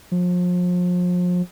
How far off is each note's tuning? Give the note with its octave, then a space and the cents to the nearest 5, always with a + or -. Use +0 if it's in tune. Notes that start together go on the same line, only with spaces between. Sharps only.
F3 +35